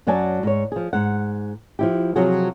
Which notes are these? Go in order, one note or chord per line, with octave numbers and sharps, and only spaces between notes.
F#2 F#3 F#4 D5 G#5 A5
G#2 C#5
F3 G#4
G#2 F#5
F3 E4 G4
C3 F3 F#3 F4 F#4 G#4